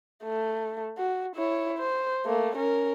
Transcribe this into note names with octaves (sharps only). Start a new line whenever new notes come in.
A3
F#4
E4 C#5
C5
A3 A#3
C#4 A#4